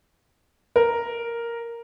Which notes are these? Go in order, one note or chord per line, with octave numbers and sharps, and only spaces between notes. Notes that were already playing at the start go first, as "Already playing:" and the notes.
A#4